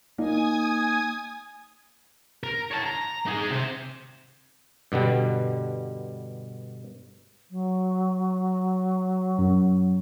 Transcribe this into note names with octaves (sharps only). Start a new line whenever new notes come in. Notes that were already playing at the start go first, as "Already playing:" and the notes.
A#3 D#4 G#5 D#6 G#6
A#4
C#5 A5
A#5
D#4 G#4
C3 C5
G2 B2 D3 G3
F#3
F#2